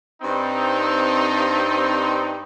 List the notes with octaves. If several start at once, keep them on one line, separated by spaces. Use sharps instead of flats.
G2 C4 D#4